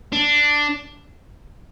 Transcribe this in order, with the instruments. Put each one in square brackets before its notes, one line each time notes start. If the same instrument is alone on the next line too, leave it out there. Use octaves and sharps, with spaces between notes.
[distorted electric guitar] D4